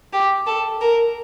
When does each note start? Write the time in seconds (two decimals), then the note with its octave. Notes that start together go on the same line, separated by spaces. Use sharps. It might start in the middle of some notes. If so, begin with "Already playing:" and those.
0.13 G4
0.47 A4
0.81 A#4